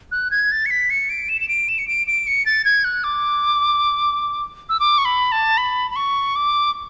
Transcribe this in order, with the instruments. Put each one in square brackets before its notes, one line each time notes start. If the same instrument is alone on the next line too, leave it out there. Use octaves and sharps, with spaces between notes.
[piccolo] F#6
G#6
A6
C#7
B6
C#7
D7
E7
E7
D7
E7
C#7
D7
D7
C#7
A6
G#6
F#6
D6
E6
D6
C#6
B5
A5
B5
B5
C#6
D6